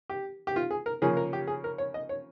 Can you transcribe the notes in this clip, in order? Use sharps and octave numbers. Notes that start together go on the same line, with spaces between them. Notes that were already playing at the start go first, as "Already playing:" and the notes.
G4
G4
F4
G#4
A#4
C#3 F3 A#3 C#4 G#4
A#4
G4
G#4
A#4
C#5
D#5
C#5